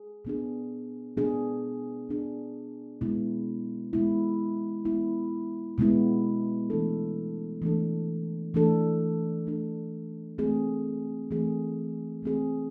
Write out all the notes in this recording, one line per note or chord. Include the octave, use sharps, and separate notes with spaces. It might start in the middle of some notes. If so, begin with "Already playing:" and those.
Already playing: G#4
B2 B3 D4 G#4
B2 B3 D4 G#4
B2 B3 D4 G#4
B2 G#3 B3 E4
B2 G#3 B3 E4
B2 G#3 B3 E4
B2 G#3 B3 E4
E3 A3 D4 A4
E3 A3 D4 A4
E3 A3 D4 A4
E3 A3 D4 A4
E3 A3 C4 G#4
E3 A3 C4 G#4
E3 A3 C4 G#4